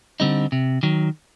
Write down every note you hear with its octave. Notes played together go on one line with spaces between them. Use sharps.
D3 G3 C4 D#4
C3
D#3 F#3